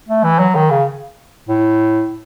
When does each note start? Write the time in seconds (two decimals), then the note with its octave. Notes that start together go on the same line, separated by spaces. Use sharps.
0.08 A3
0.24 E3
0.39 F#3
0.55 D#3
0.71 C#3
1.49 A2